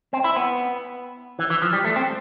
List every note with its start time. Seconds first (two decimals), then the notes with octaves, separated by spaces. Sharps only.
0.13 C4
0.24 E4
0.36 B3
1.39 E3
1.50 E3
1.62 F3
1.73 G3
1.85 A3
1.96 C4